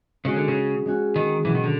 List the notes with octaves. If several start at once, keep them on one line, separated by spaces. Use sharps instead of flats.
C#3 G#3 C#4 F#4
D3
C#3
G#3 C#4 F#4
D#3
B2 E3 F#3 B3
D#3
D3